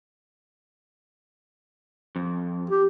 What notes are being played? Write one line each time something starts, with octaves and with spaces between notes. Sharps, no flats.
F2
G4